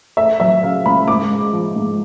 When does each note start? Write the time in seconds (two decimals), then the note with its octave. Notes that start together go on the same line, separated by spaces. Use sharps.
0.17 A3 E5
0.40 F#3 E5
0.63 C#3 F5
0.85 C#2 B5
1.08 G#2 D6
1.31 G#3
1.53 F3
1.76 G#2